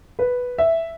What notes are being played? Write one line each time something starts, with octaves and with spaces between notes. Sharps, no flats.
B4
E5